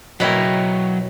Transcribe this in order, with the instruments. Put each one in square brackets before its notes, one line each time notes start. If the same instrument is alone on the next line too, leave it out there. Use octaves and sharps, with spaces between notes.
[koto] B2 E4 A#4 [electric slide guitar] F#3 C#5 G5